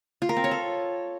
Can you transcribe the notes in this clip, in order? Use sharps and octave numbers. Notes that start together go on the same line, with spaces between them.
F4
A#4
C4
C#5
A4